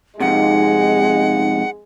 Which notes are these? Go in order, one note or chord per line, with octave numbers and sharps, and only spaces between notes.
F2 G#2 C3 G#3 D#4 F#5